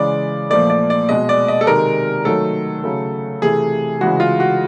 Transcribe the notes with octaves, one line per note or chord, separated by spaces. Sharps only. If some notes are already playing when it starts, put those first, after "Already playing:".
Already playing: C#3 E3 G#3 D5
A#2 F3 A3 D5
D5
D5
B2 G#3 D#5
D5
D#5
A4
C3 D#3 G#3 A#4
D#3 F#3 A3 A4
C#3 F#3 A3
C3 E3 A3 G#4
C#3 E3 G#3 F#4
F4
F#4